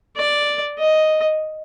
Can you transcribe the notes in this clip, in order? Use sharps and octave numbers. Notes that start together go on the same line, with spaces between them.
D5
D#5